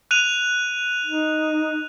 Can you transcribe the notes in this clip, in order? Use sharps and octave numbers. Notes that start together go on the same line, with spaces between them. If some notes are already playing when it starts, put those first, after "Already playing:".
F#6 D#7 F7
D#4